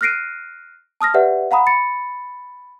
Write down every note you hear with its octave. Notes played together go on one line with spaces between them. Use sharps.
F6 F#6 A#6 C7 D7 D#7
A5 D#6 F6 A#6
G4 B4 D5 E5 F#5
F5 F#5 A#5 B5 D#6
B5 A6 C#7